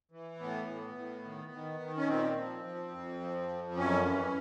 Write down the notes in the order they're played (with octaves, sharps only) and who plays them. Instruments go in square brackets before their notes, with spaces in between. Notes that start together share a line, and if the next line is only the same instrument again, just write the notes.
[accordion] E3
A2 B3
A2
A2
D#3
D#3
D#3
C#4
A#2 C4
F3
F3
F2
F3
F2
F#2 C#4
E3